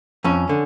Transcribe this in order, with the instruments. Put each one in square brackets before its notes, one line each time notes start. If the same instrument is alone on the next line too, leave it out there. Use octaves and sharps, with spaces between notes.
[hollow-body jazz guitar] F2 C#4
D3